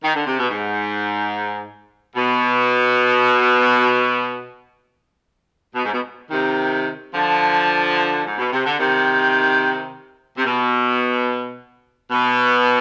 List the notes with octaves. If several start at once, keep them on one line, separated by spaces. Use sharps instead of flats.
D#3
D3
C3
B2
G#2
B2
B2
G#2
B2
C3 D#3
D3 F3
G#2
B2
C3
D3
C3 D#3
C3
B2
B2